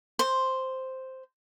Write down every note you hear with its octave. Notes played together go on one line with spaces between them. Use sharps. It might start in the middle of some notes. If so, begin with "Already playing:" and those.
C5